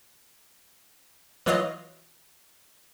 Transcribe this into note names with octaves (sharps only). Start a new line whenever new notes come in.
E3 F#3 F4 D#5